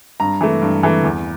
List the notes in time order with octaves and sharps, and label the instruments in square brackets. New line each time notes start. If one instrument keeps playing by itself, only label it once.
[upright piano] G2 A#5
E3 A3
G2
E3 A3
E2